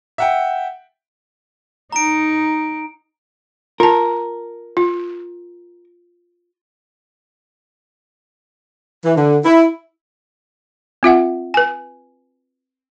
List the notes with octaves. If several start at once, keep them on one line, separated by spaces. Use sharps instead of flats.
E5 F#5 G5
D#4 A#5 D7
F4 A#4 A5
F4
E3
D3
E4
C4 F4 E5 F#5
B4 G#5